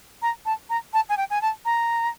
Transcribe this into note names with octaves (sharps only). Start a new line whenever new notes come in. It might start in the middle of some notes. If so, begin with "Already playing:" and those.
A#5
A5
A#5
A5
G#5
G5
G#5
A5
A#5